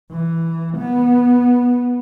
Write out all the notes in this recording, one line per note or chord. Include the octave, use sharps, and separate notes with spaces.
E3
B3